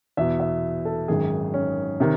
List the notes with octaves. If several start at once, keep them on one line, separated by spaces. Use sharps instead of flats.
E2 B2 E5
E5
A4
G#1 F#2 D#3 G#4
C#4
C3 D#3